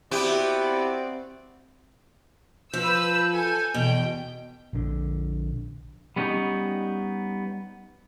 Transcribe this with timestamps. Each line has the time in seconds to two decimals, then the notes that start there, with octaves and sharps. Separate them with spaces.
0.11 B3 C4 E4 F#4 G4 D5
2.73 F3 B4 E6 G6
3.32 A4 G#5
3.74 E2 B2 G5
4.73 A#1 D3
6.16 G3 B3 C#4 D#4